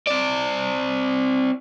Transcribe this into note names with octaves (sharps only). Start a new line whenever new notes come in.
C4 D5